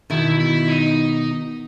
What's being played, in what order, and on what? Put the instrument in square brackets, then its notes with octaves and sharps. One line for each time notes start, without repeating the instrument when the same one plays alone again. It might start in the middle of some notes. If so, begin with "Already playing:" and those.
[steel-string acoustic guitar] B2 D#3 [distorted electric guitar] E4
[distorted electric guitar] E4
D#4